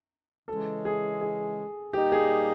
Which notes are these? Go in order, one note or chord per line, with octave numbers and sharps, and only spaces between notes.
C#3 E3 G#3 C#4 A4
G#4
G#4
A#2 G3 A#3 D#4 G4
G#4